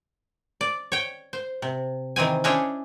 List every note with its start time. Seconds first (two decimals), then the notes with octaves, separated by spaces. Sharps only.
0.61 D5
0.92 C#5 G5
1.33 C5
1.62 C3
2.16 D#3 E3 C4 G#5
2.44 C#4 D4 E4 G#4 C5 C#5